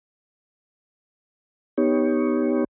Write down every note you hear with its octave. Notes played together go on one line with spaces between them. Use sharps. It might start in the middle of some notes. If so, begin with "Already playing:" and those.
B3 D#4 G4 C#5